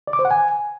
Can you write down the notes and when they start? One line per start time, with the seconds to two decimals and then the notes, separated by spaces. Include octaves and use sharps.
0.07 D5
0.13 D6
0.19 C5
0.25 F#5
0.31 G#5